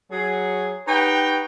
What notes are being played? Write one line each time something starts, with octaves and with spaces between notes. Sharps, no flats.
F#3 G#4
D#4 G4 B4 C#5 F#5 G5